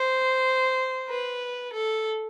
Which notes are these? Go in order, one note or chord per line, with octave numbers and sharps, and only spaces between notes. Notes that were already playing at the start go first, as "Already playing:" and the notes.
Already playing: C5
B4
A4